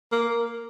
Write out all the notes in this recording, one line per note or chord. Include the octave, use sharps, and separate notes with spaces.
A#3